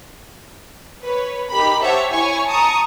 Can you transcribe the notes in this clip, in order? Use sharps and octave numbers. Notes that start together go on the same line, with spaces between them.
B4 C#5
D#4 G4 A#4 B5
G4 C5 C#5 E5 F#5 A5
E4 C#5 G#5 C#6
A5 A#5 C#6 D#6 C#7